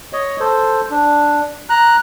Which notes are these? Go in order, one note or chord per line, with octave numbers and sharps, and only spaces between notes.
C#5 D#5
A4 C5
D4
A#5 F#6